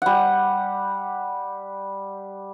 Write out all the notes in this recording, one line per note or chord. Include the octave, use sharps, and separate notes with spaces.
G3 F#5